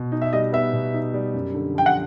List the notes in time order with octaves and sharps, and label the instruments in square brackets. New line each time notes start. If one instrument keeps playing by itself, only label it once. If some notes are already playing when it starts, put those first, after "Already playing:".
Already playing: [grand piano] B2
D#4
[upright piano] E5
[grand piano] G3 [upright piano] D#5
[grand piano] B3 [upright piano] E5
[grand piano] B2
D#4
G3
F#2
D3
[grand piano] F3 [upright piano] G5
[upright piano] F#5